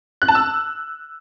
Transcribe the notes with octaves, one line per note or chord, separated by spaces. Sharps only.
F#6
A5
E6